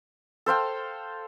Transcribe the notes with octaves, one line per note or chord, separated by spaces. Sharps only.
A4 C5 F5 G5